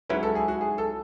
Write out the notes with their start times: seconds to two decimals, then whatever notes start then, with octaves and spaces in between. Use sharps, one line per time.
0.10 G#2 F#3 C#4 E4 B4
0.23 A4
0.35 G#4
0.48 F#4
0.61 G#4
0.78 A4